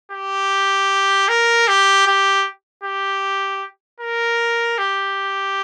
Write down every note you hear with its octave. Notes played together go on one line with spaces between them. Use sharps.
G4
A#4
G4
G4
G4
A#4
G4